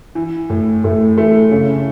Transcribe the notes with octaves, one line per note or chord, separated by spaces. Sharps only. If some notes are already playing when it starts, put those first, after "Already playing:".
E3
A2
A2 A3
E3 A3
C#3